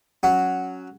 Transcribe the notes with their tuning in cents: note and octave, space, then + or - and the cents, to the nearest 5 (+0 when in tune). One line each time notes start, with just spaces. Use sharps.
F#3 +0 C#4 +0 F#4 +0